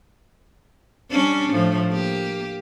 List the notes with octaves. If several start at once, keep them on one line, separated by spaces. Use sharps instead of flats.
G3 C#4 D4
A2 F3
A#3 G4